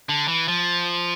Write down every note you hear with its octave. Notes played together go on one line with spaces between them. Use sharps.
D3
E3
F3